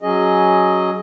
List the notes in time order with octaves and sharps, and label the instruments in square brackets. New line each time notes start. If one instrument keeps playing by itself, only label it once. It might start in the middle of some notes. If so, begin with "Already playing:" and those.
[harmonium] F#3 C#4 G#4 D#5